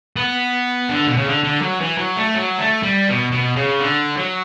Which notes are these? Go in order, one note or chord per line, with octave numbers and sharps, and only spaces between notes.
B3
D3
B2
C#3
D3
D3
F#3
E3
F#3
A3
F#3
A3
G3
B2
B2
C#3
D3
F#3